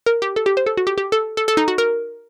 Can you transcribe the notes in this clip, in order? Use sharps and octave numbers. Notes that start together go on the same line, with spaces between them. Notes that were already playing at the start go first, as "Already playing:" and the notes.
A#4
G4
A4
G4
C5
A4
F#4
G4
G4
A4
A4
A4
D#4
F#4
A#4